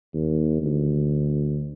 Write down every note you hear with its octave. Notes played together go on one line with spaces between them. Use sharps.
D#2
D2